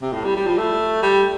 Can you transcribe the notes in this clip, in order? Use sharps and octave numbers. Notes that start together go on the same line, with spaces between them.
C3
A2
G3
G3
F3
A3
G3